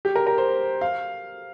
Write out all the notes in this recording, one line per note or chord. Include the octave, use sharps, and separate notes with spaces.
G4
A#4
A#4
C5
F5